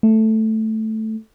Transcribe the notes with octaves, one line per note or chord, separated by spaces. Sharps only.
A3